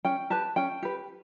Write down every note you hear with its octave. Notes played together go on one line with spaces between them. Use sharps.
C#4 G5
G4 B4 A5
C#4 G5
G4 B4